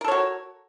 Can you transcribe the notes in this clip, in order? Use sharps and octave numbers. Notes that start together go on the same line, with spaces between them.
F#4 A4 A#4 C#5